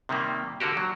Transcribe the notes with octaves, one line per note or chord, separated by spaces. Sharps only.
C3 D#3 G3 A#3
D3 A#3 F#4 G4
F#3